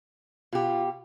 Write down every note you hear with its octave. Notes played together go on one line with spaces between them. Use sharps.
B2 F4 G4